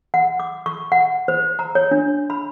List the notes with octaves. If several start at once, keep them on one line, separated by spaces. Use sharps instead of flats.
F#5
D6
C#6
F#5
C5
A#5
C#5
D4
B5